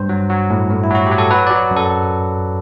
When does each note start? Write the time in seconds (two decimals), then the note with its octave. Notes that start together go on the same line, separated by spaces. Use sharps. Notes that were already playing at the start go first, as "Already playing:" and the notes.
Already playing: G2 C5
0.09 F#3
0.30 F#3
0.50 A2
0.70 A2
0.84 E4
0.90 F#3 F#4
1.06 F#3 G4
1.18 A4
1.31 F#3 B4
1.47 F#3 D5
1.71 F#2
1.77 A4